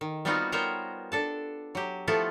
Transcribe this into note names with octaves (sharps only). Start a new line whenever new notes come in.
D#3
G3 B3 C4 D#4 F4 F#4
B3 A#4 C5 C#5 G5 A#5
D4 A4 A5
F#3 G4
F3 A3 B3 E4 F4 A4